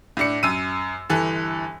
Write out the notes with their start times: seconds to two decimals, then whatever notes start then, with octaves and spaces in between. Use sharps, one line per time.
0.17 A2 D4 C#7
0.43 F#2 E6 D#7
1.10 G1 E3 A4